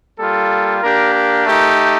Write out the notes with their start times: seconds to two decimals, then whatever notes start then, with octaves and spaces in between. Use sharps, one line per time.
0.18 G3 A#3 F4 A4
0.82 A#3 D4 G4 A#4
1.13 A#4
1.46 A3 D#4 G4